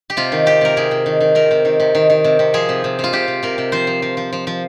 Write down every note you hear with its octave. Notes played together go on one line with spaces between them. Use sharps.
G4
C3 F4
D#3
C3 G4
C3 A#4
C3 G#4
C3
D#3
D#3
C3 A#4
C3
D#3
C3
D#3
D#3
C3
C3
F3 G#4
C3
C3
F3 F4
C3 G4
C3
C3 A#4
C3
F3 C5
F3
F3
F3
F3
F3